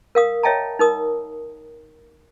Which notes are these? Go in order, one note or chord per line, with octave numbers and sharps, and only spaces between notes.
A#4 F5 D#6
C#5 D#5 E5 G5 A5 A#5
D#4 A#4 D#6